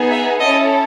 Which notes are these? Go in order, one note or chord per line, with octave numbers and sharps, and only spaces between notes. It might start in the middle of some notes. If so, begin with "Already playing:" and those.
Already playing: B3 D#4 G#4
E5
C#4 E4 A4 D#5